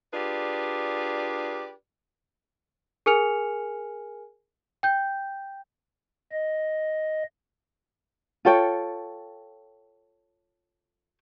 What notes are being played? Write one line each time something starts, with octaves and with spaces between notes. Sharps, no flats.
D4 F4 G4 G#4 B4 D5
G#4 A#4 G#5 F6 C#7 F7
G5 G6
D#5
F4 A4 C#5 G5